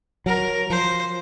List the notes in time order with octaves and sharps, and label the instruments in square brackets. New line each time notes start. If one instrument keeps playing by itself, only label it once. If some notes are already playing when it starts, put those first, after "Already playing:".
[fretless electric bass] F#3 [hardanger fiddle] A#4
[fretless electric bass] F3 [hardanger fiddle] C5